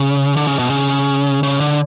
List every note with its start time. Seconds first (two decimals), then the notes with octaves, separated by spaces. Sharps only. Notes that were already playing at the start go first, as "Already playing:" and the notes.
Already playing: C#3
0.37 D3
0.47 C#3
0.59 B2
0.70 C#3
1.43 C#3
1.60 D3